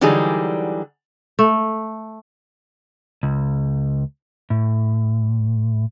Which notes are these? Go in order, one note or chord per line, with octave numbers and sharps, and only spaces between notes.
D3 E3 F#3 G3 D#4 G#4
A3
C#2
A2